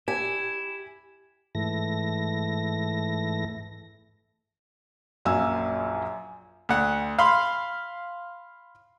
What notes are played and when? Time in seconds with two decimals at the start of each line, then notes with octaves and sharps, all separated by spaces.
0.08 E4 G4 G#5
1.55 G#2 E3 A3 A#6
5.25 A#1 F#2 F5 G#5 E6
6.69 D2 F#5
7.19 F5 B5 C6